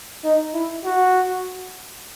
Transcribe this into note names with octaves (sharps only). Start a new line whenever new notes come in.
D#4
E4
F#4